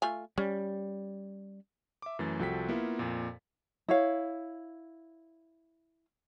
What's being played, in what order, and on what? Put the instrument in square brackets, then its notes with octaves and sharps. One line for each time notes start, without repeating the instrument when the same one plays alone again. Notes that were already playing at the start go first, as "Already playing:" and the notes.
[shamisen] A3 F4 G#5
[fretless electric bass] G3 [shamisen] C#4
[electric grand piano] E5 D6
F#2 E3 A3 A6
C2 F3 F#4 A4 G5 B6
A#3 B3 E4 F4
F2 A#2
[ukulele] E4 C#5 F5